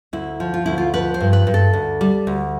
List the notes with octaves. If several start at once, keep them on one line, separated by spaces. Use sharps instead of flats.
D2 E4
F3
F4
D2 E4
F4
F3 B4
C5
G2
B4
G2
A4
D2
G3
D2